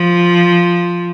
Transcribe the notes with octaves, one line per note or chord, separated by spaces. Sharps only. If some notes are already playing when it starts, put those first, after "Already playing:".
Already playing: F3